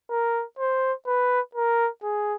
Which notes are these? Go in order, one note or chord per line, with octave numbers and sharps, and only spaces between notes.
A#4
C5
B4
A#4
G#4